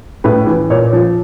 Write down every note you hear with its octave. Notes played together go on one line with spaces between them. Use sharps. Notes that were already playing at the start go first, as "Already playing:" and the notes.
A2 B4
E3
A#2 C#5
F3